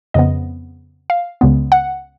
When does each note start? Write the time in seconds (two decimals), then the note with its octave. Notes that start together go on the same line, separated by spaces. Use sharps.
0.14 F2 C#3 F3 B3 D#5
1.10 F5
1.41 C#2 C#3 G#3 B3
1.72 F#5